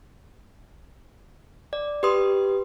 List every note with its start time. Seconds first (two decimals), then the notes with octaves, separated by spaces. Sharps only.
1.73 D5
2.03 G4 B4 C6 D#6